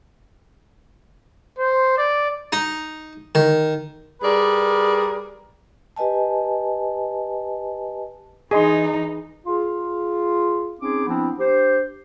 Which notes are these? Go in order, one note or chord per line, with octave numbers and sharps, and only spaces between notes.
C5
D5
D#4
D#3
G3 G#4 A#4 B4 D5
G4 B4 D#5 G#5 A5
E3 D#4 G#4 D#5 C6
F4 G#4
C4 C#4 D#4 G#4 D6
F3 B3 C4 D4 E4
D4 G4 C5